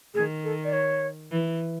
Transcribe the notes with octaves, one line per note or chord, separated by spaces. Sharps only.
D#3 G#4
A4
D5
C#5
E3